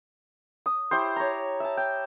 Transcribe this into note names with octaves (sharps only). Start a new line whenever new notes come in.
D#6
E4 G4 C5
C#5 A#5
E5 A5
G5